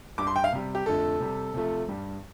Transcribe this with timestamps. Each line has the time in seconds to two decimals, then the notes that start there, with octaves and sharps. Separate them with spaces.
0.18 G2 G3 D6
0.27 C6
0.36 G5
0.44 F5
0.53 C3 G3
0.75 G4
0.86 F2 D3 A3 A4
1.20 C3 G3
1.54 C3 F3 A3
1.88 G2 G3